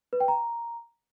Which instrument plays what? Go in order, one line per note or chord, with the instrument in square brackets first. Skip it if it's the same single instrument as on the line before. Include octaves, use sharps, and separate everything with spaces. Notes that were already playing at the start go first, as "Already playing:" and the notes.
[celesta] B4
G5
A#5